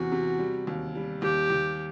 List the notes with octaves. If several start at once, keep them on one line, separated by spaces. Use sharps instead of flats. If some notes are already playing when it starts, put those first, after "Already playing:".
Already playing: E2 C3 F#4
C3
G3
D#2
G3
D#2 G4
D#2